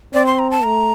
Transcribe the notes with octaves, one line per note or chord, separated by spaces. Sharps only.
C4 D5
C6
A#5
A5
A3 A#5